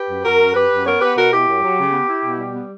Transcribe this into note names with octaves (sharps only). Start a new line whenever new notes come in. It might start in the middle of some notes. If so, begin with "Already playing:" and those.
Already playing: G4 B4
F#2
F#2 F#4 A#4
F#2
F#2 G4 B4
F#2
B3 A#4 C#5
B3 G4 B4
B2 F#4 A#4
E4 G4
F#2
F#3
C#3
B3
E4
B2
G3
B3